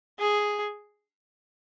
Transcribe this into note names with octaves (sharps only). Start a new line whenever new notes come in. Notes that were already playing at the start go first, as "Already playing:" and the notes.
G#4